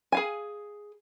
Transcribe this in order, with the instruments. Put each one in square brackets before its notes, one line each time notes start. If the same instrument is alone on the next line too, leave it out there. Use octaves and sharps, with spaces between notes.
[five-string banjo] G#4 F5 G#5